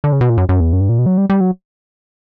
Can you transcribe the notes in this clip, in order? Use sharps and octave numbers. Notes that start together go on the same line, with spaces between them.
D3
C#3
B2
A#2
F#2
F#2
E2
F#2
G2
A#2
B2
F#3
G3
G3
F#3